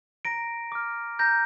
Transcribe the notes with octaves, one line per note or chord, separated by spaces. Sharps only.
A#5 A#6 D7
D6 F6
A#5 G6 A#6